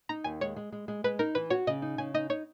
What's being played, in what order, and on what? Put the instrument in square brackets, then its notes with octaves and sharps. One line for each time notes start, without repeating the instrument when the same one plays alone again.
[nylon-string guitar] D#4 [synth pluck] A#5
[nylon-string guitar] D#2 [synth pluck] G#5
[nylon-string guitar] G#3 [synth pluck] C#5
[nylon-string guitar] G#3
G#3
G#3
[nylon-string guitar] G#3 [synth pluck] B4
[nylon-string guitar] D#4 [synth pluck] A#4
[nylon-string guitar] E3 [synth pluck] B4
[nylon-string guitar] F#4 [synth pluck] C#5
[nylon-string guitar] C#3 [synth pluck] D#5
[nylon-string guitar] D#4
[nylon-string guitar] C#3 [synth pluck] G#5
[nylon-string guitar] D#4 [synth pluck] D#5
[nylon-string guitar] D#4 [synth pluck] C#5